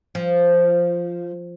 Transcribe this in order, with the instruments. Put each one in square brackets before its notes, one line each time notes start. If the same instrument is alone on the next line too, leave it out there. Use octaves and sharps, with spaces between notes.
[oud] F3